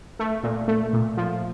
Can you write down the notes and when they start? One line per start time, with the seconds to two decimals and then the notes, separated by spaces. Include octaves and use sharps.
0.19 A3
0.43 A#2
0.68 A3
0.93 A#2
1.17 F3